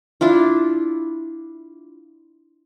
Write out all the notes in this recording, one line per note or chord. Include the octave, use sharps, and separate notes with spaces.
D4 E4 F4